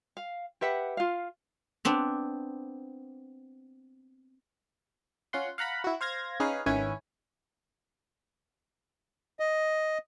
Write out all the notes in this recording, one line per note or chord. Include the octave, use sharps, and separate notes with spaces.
F5
G4 B4 E5 F#5
F4 F5
B3 C4 D4
C#4 F4 F#5 C6
F5 F#5 A#5 B5
E4 F#4
C5 F5 G#6 A#6
C#4 D#4 G#4 B4 F5
G#1 D#3 C#4 E4 B4 G#5
D#5